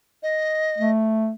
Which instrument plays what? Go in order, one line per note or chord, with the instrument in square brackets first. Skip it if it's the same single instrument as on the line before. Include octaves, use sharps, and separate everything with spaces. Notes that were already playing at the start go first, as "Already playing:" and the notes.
[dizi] D#5
[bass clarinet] A3